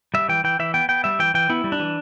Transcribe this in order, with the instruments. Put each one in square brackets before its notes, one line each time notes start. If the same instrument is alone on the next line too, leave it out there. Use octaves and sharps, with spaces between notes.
[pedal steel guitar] G3 E5
E3 G5
E3 G5
E3 E5
B3 G5
B3 G5
G3 E5
E3 G5
E3 G5
B3 E4
G3
D4
E3